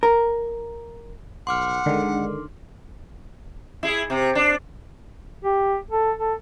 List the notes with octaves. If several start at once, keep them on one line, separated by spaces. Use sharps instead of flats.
A#4
B1 F#5 C6 D6 F6
D3 D#3 G#3
E4 G#4
C3
D4
G4
A4
A4